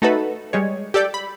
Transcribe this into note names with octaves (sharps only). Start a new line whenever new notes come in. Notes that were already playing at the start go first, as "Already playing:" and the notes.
A3 D#4 F#4 A4 B4
G3 G#3 C#5
G4 A4 D5 G5
B5